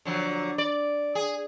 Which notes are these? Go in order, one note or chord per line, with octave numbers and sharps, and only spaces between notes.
D3 F3 F#3
D5
G#4